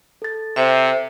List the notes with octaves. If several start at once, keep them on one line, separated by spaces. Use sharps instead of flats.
A4 A6
C3 C5 E5